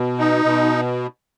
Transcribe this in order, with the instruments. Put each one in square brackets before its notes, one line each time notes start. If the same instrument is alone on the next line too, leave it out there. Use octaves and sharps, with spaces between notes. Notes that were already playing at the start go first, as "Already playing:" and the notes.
Already playing: [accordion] B2
D#4
B2